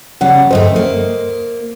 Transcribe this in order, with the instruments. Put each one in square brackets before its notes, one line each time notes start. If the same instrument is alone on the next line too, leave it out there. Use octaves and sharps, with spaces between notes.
[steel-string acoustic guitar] C#3 G3 [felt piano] F#5
[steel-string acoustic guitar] D2 G2 A3 [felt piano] C5 D#5
[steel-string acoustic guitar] A#3